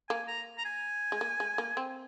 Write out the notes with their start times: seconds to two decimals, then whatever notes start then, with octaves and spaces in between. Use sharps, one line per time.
0.09 A#3 G#5
0.28 A#5
0.58 A#5
0.65 G#5
1.12 G#3
1.21 A#3
1.40 G#3
1.58 A#3
1.77 C4